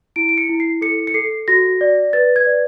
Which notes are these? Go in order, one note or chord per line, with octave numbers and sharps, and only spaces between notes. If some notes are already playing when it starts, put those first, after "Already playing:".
E4 D7
D7
C#7
E4
C7
A4 C#7
C#7
A4 C7
F#4 A#6
D5
B4 A6
G#6
D5